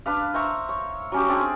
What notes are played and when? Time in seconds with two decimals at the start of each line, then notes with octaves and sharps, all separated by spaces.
0.06 D4 B4 F5
0.34 C5 E5 A#5 C#6
0.69 C#5
1.12 F#3 C#4 G4
1.29 C4 D4 G#4